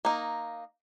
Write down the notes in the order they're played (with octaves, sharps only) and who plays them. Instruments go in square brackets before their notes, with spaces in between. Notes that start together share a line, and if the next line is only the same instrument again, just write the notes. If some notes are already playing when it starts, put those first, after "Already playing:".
[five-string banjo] A#3 D#4